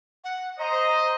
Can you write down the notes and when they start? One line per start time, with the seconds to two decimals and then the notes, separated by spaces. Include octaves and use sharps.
0.24 F#5
0.59 C5 D#5 A#5